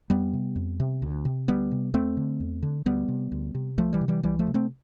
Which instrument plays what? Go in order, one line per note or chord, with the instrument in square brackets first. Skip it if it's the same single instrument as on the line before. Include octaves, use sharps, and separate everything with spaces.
[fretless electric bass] F2 G3 B3
C3
F2
C3
D2
C3
D2 G3 B3
C3
E2 A3 C4
D3
E2
D3
D2 G3 B3
C3
D2
C3
C2 F3 A3
E3 G3
C3
E3 G3
C2 E3 G3
F3 A3
C3
A3 C4